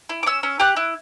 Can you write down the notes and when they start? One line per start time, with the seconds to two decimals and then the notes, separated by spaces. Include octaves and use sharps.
0.09 E4
0.23 D6
0.26 C#4 E6
0.43 C#4
0.60 G4 F#6
0.77 E4